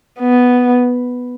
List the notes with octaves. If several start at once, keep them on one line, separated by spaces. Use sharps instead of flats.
B3